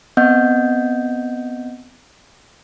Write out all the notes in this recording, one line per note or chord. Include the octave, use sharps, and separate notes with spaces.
B3 C4 D#5 F#5 G6